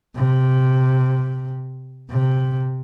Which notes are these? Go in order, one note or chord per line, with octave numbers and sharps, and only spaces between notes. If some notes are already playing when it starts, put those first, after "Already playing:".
C3
C3